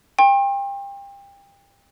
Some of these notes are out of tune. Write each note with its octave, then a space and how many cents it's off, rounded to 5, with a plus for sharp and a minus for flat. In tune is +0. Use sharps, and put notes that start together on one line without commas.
G5 +30 C6 +45